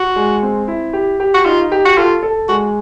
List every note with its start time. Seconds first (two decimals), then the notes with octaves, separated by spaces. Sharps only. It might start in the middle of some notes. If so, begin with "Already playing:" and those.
Already playing: F#4
0.16 G#3
0.43 C4
0.68 E4
0.93 G4
1.20 G4
1.34 F#4
1.45 D#4 F4
1.72 G4
1.86 F#4
1.97 F4 A4
2.23 A4
2.49 G#3 F#4